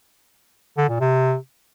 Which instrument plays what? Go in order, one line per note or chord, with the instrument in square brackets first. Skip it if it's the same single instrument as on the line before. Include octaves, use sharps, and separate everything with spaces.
[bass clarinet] D3
A#2
C3